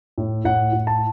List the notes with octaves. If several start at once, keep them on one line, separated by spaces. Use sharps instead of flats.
A2
A2 F#5
A2
A5